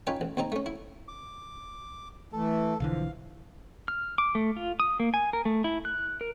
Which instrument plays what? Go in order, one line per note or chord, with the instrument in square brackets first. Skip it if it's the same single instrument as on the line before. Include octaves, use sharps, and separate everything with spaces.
[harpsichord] C#4 D#4 F4 B4 G5 G#5
A1
D#2 C4 D#4 A#5
A3 C#4
E4
[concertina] D6
[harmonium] E3 A3 [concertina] A4
[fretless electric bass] B1 D3 E3 [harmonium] F3 [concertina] F5
[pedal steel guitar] F6
D6
A3
F4
D#6
A#3
G#5
A#4
A3
E4
F#6
A#4